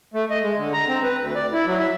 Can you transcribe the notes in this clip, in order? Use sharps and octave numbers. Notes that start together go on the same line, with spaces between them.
A3
D#5
G#3
D3
A#5
C4
B4
D2
D5
E4
F#3
E5